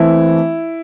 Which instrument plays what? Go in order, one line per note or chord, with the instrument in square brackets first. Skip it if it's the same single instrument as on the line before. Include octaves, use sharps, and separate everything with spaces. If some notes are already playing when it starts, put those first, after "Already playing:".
Already playing: [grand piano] E3 A3 C4 E4